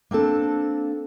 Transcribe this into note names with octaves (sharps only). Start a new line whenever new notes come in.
A#3 C4 D4 A4